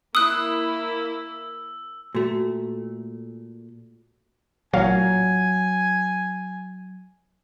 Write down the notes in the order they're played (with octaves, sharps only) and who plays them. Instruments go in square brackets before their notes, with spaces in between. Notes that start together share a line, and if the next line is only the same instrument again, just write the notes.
[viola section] A#3 E4 [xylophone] D#6 F#6 [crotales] E6
[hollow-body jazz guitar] A#2 A3 [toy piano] F#4
[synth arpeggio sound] A1 A#2 F5 [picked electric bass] F#3 [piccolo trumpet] G#5